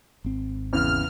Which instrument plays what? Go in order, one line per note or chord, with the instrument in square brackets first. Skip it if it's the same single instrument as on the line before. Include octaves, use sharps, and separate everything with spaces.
[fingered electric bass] G#1 C4
[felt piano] E2 C#3 [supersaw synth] F6